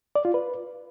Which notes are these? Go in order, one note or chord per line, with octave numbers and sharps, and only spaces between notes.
D5
F4
B4